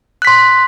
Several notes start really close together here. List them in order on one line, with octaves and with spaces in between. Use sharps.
F#6 B6 C6